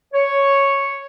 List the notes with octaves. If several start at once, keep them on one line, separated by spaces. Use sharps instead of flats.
C#5